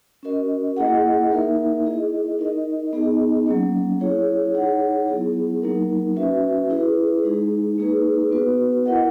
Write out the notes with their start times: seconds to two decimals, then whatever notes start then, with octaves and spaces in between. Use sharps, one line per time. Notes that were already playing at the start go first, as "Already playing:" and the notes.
0.23 C#4 F#4 A#4 D#5
0.77 A#3 E4 G#4 D#5 F#5
1.31 A#3 D#4 A#4 E5
1.85 E4 G#4 D#5
2.39 D#4 A#4 D#5
2.93 B3 D#4 G#4 D#5
3.46 F#3 A#3 C#4
4.00 E4 G#4 C#5
4.54 D#4 G#4 C#5 F#5
5.08 F#3 B3 E4 G#4
5.62 F#3 A#3 D#4 A#4
6.16 C#4 F#4 B4 E5
6.70 E4 G#4 B4
7.23 G#3 D#4 G#4
7.78 A#3 D#4 G#4 B4
8.31 B3 F#4 B4
8.86 E4 A#4 D#5 F#5